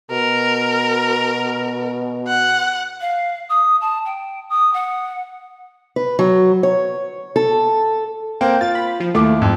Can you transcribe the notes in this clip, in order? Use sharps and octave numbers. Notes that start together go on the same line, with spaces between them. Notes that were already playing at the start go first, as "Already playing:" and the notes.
B2 A#4
F#5
F5
D#6
A5
G5
D#6
F#5
B4
F#3
C#5
A4
A#3 C4 G5
F4 A6
B5
F3
D#2 A3 E4 D6
F2 G#2